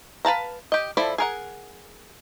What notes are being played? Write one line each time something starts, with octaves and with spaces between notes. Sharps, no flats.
B4 F5 A5 A#5
G4 D#5
F3 E4 A4 D5 B5
G#4 A#4 F#5